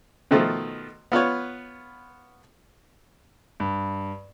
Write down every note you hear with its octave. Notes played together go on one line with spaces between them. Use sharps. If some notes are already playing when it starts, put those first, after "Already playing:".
B2 D#3 F3 A3
B3 F4 B4 C#5
G2